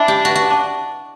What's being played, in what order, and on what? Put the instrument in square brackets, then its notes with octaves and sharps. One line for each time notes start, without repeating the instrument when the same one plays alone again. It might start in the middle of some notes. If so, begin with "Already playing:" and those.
Already playing: [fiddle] D4 [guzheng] E4
[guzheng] G4
F#4
F#4